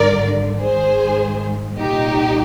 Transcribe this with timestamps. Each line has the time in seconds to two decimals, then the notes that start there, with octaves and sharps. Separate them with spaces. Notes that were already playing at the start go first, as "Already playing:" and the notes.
Already playing: G#1 G2 D3 A#4 D5
0.61 G#1 G#2 D#3 G#4 C5
1.78 C2 A#2 D#4 G4